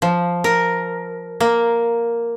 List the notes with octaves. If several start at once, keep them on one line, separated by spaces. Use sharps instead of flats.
F3
A#4
A#3